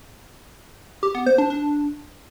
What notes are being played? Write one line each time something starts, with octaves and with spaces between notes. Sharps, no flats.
G4
B3
C5
D4
D4